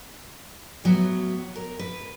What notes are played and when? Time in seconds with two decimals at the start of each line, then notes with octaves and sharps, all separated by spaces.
0.84 A2 F#3 B3
1.56 A#4
1.79 B4